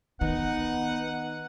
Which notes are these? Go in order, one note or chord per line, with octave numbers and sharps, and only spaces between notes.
D#3 B3 D#4 F#5